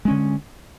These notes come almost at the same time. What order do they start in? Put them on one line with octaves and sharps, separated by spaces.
G#3 C#4 D3